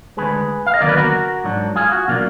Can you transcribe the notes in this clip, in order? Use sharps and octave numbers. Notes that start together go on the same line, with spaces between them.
D2 D3 G#3 G#4 B4
F5
D#5
D#2 D3 F#3 B3 A#4 D5
B4
F#4 A#4
G#2 F#3 D4
F4 G#4
F#4
B2 F#3 A#3 D4 F4